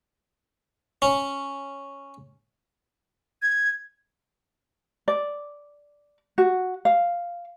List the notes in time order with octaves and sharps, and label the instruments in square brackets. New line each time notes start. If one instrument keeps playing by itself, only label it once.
[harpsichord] C#4
[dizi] G#6
[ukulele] D5
F#4
F5